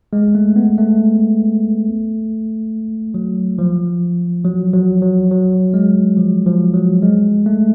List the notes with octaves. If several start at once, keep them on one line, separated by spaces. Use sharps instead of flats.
G#3
A3
B3
A3
F#3
F3
F#3
F#3
F#3
F#3
G#3
F3
F3
F#3
G#3
A3